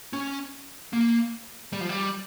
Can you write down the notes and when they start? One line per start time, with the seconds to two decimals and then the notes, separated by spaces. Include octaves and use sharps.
0.13 C#4
0.93 A#3
1.73 G3
1.81 F3
1.89 G3